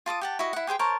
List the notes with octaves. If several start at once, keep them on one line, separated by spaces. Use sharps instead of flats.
F4 A5 D6 D#6
G4 F#5 A5
E4 F#4 D#5
E4 F#5
G4 G#4 C5 G5
A#4 C5 C#5 A5